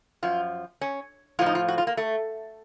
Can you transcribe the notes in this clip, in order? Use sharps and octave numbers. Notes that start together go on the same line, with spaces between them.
F#2 F3 F4
C#4
A2 F3 F4
D#4
F4
F#4
F4
A#3
A3